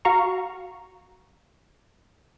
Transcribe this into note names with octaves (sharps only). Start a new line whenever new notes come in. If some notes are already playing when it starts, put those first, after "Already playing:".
F#4 F5 A#5 C#6